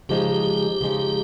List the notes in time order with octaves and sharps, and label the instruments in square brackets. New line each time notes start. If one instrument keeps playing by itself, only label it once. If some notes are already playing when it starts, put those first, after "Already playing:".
[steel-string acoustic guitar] C#3 F3 G#3 D#4 [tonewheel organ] G4
[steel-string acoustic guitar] C#3 F3 G#3 D#4